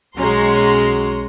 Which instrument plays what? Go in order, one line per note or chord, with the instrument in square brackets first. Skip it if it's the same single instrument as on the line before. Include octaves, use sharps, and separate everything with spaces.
[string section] B1 G#3 C#4 F#4 A#5 C6